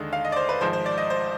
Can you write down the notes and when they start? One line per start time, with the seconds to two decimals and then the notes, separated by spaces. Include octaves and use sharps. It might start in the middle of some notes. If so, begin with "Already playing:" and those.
Already playing: D#2 D3 G#3 D#5
0.13 F5
0.25 D#5
0.32 D5
0.36 C5
0.49 B4
0.61 G#1 G#2 F3 G#3 C5
0.73 C5
0.86 D5
0.98 D#5
1.10 C5